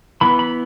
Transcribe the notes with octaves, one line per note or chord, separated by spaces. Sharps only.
E3 B3 B5
B5